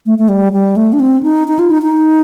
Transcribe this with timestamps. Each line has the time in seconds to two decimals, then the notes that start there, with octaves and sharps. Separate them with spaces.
0.06 A3
0.18 A3
0.29 G3
0.52 G3
0.76 A3
0.93 D4
1.00 C4
1.23 D#4
1.48 D#4
1.59 F4
1.71 D#4
1.82 D#4